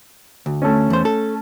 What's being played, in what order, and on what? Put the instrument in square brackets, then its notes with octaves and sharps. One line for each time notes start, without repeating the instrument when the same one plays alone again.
[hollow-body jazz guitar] D2
[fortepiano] A3 C#4
[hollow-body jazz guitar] E2 C5
A4